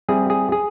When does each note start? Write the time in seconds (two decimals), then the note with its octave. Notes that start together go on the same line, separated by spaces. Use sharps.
0.08 G3 C4 E4 G#4
0.30 G#4
0.52 G#4